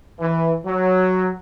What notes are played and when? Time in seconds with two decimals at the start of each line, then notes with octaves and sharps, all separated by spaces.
0.20 E3
0.65 F#3